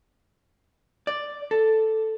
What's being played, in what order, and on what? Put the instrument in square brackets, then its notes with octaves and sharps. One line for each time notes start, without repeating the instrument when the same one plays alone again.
[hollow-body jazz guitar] D5
A4